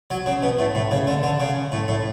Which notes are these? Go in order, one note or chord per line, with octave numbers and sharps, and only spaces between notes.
F#3
C#3
B2
A2
A2
C#3
D3
D3
C#3
A2
A2